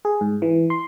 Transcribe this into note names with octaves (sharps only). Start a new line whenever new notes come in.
G#4
G#2
E3
C6